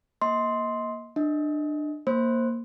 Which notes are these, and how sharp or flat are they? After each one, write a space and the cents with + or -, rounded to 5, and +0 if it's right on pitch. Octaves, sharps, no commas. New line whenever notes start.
A#3 +10 D#5 +30 C6 +0
D4 +25 D#5 +25
A#3 +0 C5 +10